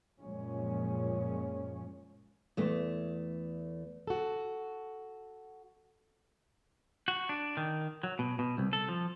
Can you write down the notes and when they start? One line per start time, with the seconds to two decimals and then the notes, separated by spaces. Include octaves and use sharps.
0.21 F#2 A#2 F3 G#3 C#4
2.57 E2 A3
4.07 F#4 A4
7.08 F#4
7.29 D4
7.57 D#3
8.03 F#3
8.19 B2
8.39 B2
8.58 C2
8.73 A4
8.89 F3